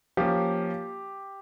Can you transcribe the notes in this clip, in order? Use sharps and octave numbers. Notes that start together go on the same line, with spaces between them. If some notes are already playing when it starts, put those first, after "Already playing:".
F3 A#3 C#4 G4